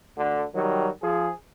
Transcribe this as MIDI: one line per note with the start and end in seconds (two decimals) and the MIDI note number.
0.18 0.45 38
0.18 0.45 50
0.54 0.89 51
0.54 0.89 54
0.54 0.89 55
1.02 1.32 53
1.02 1.32 68